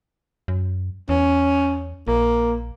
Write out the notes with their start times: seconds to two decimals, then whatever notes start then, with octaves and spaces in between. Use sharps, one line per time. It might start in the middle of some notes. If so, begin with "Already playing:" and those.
0.48 F#2
1.09 E2 C#4
2.07 A#1 A#3